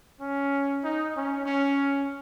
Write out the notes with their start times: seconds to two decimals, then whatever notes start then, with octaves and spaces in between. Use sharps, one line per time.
0.20 C#4
0.83 D#4
1.14 C#4
1.46 C#4